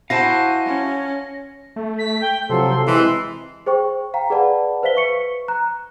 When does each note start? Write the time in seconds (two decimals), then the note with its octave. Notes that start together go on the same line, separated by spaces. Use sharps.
0.10 E4 F#4 C5 F5 G#5 A5 A#6
0.65 C#4
1.76 A3
1.98 B6
2.21 G5
2.49 C3 F3 F#3 A4 C6
2.88 C3 E3 G#3 C6
3.66 G#4 C5 G5 C#6
4.14 F5 G5 A#5
4.30 G#4 B4 D5 F#5 A5 B5
4.83 B4 C5 E5 F5 B6 G7
4.96 B4 C#6 C#7
5.48 A#5 F#6